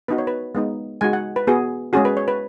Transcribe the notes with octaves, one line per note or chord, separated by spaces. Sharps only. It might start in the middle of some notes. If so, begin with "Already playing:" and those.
B3 D#4 F#4 B4
C#5
B4
G#3 B3 D#4
G#3 D#4 F#4 G#5
F#5
B4
B3 F#4 G#4
G#3 C#4 F#4 G#4
B4
C#5
B4